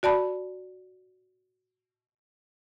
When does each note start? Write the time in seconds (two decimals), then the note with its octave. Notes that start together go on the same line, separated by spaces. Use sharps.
0.03 F#4 D5 A5 B5